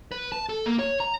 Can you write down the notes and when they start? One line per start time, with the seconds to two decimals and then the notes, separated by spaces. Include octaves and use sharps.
0.12 B4
0.32 A5
0.49 A4
0.66 A#3
0.79 C#5
1.00 A#5